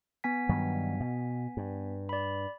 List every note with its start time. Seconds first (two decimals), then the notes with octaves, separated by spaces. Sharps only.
0.24 B3 G#5 B6
0.49 G2 D#3 F#3
1.00 B2
1.57 G2
2.09 D5 B5